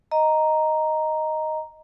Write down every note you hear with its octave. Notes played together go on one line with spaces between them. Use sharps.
D#5 A#5